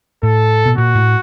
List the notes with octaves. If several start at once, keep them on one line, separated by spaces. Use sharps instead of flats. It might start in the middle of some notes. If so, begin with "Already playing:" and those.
A2 A4
B2
A#2 F#4
A2